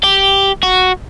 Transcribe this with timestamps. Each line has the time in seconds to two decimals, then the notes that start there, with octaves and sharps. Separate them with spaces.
0.03 G4
0.63 F#4